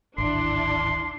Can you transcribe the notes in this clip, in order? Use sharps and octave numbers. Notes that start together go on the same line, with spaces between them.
D1 G#1 D4 E4 C6